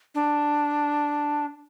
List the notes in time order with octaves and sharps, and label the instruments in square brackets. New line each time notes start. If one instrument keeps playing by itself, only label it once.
[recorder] D4